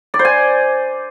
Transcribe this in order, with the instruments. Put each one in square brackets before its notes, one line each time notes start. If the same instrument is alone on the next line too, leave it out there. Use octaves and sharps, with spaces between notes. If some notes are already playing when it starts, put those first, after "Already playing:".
[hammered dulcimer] D5
C5
G#5